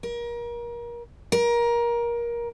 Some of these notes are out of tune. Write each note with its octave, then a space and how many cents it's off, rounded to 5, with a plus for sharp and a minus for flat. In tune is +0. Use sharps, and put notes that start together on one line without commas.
A#4 +30
A#4 +20